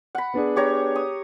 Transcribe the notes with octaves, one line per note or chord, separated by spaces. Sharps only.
F#5 B5
B3 D4 G#4
G4 C#5 A#5
D#6